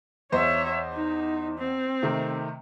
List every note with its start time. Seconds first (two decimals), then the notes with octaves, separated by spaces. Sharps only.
0.32 E2 C5 C#5 D#5 E5
0.93 D#4
1.58 C4
2.03 C3 D#3 A3